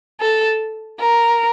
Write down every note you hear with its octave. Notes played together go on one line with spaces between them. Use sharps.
A4
A#4